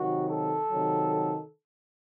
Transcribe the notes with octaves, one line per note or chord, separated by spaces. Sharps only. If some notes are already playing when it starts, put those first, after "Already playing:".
Already playing: C3 D#3 F#3 F#4
A4
C3 D#3 F#3